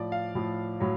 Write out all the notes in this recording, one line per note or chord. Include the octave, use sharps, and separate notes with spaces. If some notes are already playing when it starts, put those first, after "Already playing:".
Already playing: A2 F3 D5
F5
A2 F3
A2 F#3